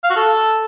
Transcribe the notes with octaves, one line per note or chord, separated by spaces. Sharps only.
F5
F#4
A4